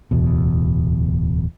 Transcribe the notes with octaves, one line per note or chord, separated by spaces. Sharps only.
D1 E2 B2